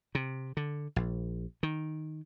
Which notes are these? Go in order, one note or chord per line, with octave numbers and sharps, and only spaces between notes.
C3
D3
A#1
D#3